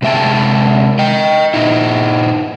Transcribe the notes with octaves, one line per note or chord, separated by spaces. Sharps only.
C3 G#3 E5 G5 A5
D#5 G5
A#2 D#4 E4